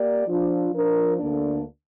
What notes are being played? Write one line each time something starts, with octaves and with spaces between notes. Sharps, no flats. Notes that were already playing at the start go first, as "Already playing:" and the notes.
Already playing: A#3 G4 D5
F3 D4 F4
F3 D4 A#4
D2 D3 A#3 D4